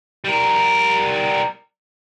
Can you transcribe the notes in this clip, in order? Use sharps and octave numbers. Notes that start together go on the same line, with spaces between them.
G3 A#4